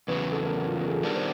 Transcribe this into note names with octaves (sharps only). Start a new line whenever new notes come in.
E2 C#3 F#3 B4
A4
A#4
F#4
F4
A#4
G#4
A4
D#3 G3 B3 D4 A#4
C5